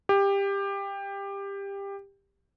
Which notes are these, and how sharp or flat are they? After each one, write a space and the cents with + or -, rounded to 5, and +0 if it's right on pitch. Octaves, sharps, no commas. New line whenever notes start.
G4 +20